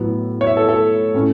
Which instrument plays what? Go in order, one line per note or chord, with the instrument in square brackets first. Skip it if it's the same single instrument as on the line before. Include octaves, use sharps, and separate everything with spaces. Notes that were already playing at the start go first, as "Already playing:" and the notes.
Already playing: [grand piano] A2 F#3 B3
C#5
E5
A4
A4
A2 A3 C#4